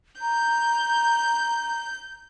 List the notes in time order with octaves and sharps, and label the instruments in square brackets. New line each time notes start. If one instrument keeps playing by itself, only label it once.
[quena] A#5 [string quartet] G6